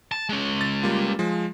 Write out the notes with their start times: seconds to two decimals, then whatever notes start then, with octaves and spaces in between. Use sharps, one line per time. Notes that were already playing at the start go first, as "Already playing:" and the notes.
0.12 A5
0.29 G#3 C#4
0.61 A6
0.83 G3 A#3 F4
1.19 F3 G#3